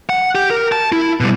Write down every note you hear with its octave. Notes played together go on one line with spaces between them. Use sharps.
F#5
G4
A#4
A5
E4
B2 G3